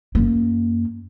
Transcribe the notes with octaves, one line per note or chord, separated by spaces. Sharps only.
F#2 A#3